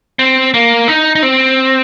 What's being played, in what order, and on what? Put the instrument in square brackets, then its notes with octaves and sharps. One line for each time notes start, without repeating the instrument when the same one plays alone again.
[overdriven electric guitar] C4
A#3
D#4
D#4
C4